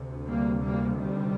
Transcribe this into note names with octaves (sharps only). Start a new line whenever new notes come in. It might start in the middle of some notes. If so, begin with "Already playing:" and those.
Already playing: D2 C3
G3 A#3
G3 A#3
D#3 G3